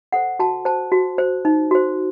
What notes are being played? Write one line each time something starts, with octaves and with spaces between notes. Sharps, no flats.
A4 C5 F#5
F#4 A5
C5 A5
F#4
C5
D#4
F#4 C5